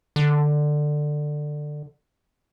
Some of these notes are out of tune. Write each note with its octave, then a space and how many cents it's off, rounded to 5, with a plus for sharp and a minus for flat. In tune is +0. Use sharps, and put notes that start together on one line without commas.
D3 +15